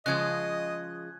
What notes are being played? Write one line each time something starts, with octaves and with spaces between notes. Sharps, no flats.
C#3 F3 G#3 D#5 F#6 G#6